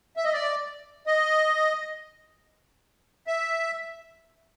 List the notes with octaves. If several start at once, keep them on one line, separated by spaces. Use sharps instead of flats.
E5
D#5
D5
D#5
E5